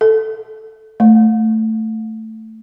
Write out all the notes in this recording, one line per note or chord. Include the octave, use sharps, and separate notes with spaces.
A4
A3